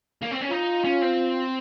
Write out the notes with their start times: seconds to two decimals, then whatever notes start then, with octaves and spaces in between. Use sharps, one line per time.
0.22 A#3
0.31 C4
0.41 C#4
0.50 D#4 F4
0.84 C#4
1.02 C4